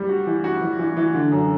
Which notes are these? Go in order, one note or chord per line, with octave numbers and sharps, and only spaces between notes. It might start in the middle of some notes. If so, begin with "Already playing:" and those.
Already playing: G3
F#4
E3
F#4
E3
E3
E3
D3
F#2